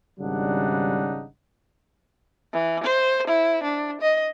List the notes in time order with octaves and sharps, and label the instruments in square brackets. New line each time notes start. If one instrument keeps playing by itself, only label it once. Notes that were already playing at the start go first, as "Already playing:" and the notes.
[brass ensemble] G#1 C#3 G3 D4 D#4 F#5
[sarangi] E3
C5
E4
D4
D#5